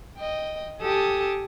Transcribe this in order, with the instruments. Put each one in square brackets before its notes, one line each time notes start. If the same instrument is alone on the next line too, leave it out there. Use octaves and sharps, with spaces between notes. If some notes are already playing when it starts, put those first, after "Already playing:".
[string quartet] D#5 G5
G4 A4 G#5 A5 D#6